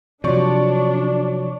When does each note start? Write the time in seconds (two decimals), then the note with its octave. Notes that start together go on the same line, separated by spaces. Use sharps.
0.24 C3 F3 F#3 D4 C#5 D5 C#6